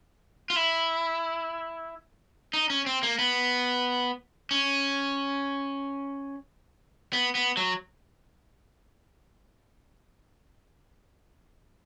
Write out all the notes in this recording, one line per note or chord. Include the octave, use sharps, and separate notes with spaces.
F4
E4
D#4
C#4
C4
A#3
B3
C#4
B3
B3
F#3